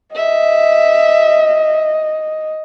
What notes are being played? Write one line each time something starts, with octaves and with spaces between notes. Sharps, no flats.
D#5 E5